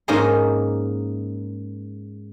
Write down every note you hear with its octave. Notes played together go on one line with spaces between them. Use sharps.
G#2 A#3 C#4 D#4 A#5 C6